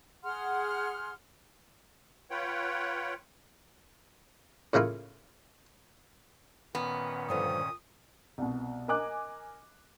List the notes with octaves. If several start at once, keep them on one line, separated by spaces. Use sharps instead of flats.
G#4 F#5 C6 F6
F4 B4 C#5 F#5 G5
A2 C#3 A#3 E4 F4
A#2 D#3 B3 C#4
G2 D3 F3 D#6
C2 B2
A#4 D#5 G#5 D6 F#6